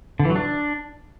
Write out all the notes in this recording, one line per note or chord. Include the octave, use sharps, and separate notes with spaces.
D3
E3
F#3
D4